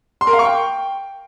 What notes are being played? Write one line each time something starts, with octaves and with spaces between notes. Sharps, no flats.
C6
A#4
F5
C#6
G5